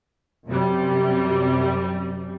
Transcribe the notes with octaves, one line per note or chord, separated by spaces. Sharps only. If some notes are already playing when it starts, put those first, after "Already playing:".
F#2 C3 G3